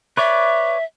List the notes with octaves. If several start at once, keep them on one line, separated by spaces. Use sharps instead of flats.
B4 C#5 D5 E5